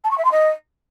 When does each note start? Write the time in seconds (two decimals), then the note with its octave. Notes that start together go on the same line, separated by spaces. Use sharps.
0.04 A5
0.11 C#6
0.18 E5
0.25 C6
0.31 D#5